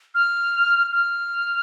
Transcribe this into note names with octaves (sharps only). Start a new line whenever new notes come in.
F6
F6